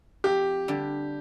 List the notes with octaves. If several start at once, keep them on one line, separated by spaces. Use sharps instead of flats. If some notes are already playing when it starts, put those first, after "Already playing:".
F2 G4
D3 G3 D4